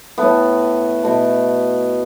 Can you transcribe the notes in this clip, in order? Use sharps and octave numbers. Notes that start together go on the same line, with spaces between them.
A2 A3 B3
B2 A3